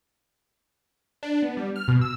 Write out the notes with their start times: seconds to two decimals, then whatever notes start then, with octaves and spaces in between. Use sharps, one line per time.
1.23 D4
1.42 B3
1.57 G3
1.76 F6
1.88 B2
2.01 E6